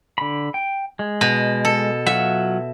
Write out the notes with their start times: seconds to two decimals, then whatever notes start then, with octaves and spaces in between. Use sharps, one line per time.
0.18 D3 B5
0.54 G5
0.99 G#3
1.21 B2
1.65 A4
2.06 F#3 F4 E5 F#5